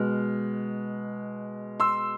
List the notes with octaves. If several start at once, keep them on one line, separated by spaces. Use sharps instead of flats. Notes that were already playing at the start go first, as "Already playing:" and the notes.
Already playing: B2 G#3 B3 F6
C6 E6